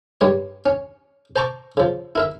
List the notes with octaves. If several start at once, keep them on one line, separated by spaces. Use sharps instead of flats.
G2 G3 C#5
C#4
C5 A5 A#5 C#6 D6
C#3 F3
E4 A#4 E5